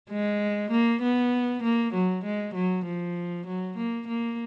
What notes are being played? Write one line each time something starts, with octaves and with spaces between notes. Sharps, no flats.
G#3
A#3
B3
A#3
F#3
G#3
F#3
F3
F#3
A#3
A#3